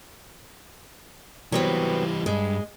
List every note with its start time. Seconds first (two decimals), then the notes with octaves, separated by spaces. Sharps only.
1.52 E3 F#3 G3 B3 C4
2.26 G2 G#3